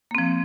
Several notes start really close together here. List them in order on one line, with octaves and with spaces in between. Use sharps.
A#3 C4 F3